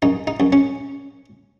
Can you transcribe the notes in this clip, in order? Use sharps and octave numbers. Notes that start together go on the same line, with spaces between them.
F#2 D#4
D#4
F#2
C#4